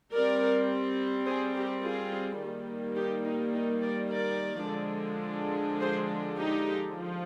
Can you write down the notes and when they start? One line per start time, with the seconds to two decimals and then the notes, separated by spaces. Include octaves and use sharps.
0.13 G3 C4 A#4 D5
1.26 G#4 C5
1.54 G4 A#4
1.83 F4 G#4
2.40 D#3 G3 A#3
2.97 D#4 G4
3.25 D#4
3.53 D#4
3.82 A#4 D5
4.10 A#4 D5
4.67 D3 F3 G#3 D4
5.81 G#4 C5
6.37 D#4 G4
6.95 F3